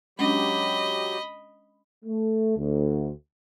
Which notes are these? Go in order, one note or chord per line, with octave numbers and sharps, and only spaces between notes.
F#3 G#3 C#4 D4 G4 D#5 B5
A3
D2